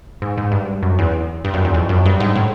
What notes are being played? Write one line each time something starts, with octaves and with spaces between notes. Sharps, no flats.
G#2
G#2
G2
F#2
E2
G2
F#2
E2
F2
F#2
G2
G#2
A2